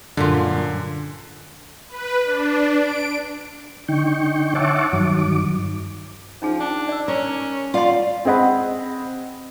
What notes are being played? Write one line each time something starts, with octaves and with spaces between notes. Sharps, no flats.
F#2 A#2 D3 F4
B4
D4
D7
D3 D#4 G5 C#6
C#5 E5 F#5 A5 C#6 D6
G2 D#3 F#3 D6
F3 C#4 D#4 G#4
D4
D5 E6
C#4 A#4
F4 D5 F5 F#5 C6
C4 G#4 D#5 F#5 B5